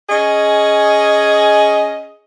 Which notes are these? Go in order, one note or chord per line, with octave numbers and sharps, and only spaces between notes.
C#4 G#4 D#5